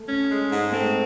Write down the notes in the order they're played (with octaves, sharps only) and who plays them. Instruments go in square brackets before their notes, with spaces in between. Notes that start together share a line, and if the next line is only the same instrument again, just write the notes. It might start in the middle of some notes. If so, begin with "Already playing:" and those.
Already playing: [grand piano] A3
[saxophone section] C#4
G#3
G#2
[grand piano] A3 [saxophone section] C4